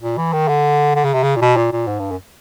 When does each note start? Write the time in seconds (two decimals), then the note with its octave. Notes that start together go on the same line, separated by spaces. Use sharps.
0.02 A#2
0.18 E3
0.33 D#3
0.48 D3
0.95 D3
1.04 C#3
1.14 C3
1.23 C#3
1.36 A#2
1.41 B2
1.57 A#2
1.72 A#2
1.87 G#2
1.99 G2
2.11 F#2